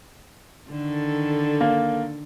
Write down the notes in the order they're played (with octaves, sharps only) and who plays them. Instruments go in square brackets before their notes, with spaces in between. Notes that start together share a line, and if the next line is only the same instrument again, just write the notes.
[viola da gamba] D3 D#3 A4
[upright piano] A#3